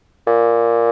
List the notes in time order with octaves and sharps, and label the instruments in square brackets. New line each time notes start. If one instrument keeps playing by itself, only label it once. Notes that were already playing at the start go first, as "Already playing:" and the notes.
[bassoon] A#2